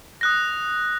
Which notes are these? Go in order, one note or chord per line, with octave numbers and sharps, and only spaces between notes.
D#6 F#6 A#6